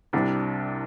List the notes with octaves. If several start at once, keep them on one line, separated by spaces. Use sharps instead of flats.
C2 C3 G3 D4 G4